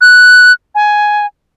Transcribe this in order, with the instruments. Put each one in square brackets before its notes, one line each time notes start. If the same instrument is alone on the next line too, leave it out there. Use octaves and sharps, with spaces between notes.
[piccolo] F#6
G#5